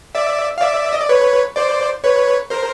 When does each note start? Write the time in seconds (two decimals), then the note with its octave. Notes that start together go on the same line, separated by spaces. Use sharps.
0.15 D5 E5
0.58 F5
0.61 D5 E5
0.93 D#5
1.00 D5
1.09 B4 C#5
1.56 C5 D5
2.04 B4 C#5
2.50 A#4 C5